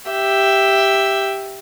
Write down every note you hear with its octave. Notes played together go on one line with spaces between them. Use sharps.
G4 E5